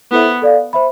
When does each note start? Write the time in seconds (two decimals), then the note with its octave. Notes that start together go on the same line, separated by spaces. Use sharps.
0.11 B3 E4 A4 C5 E5
0.42 A4 D5 F5
0.73 C5 E5 B5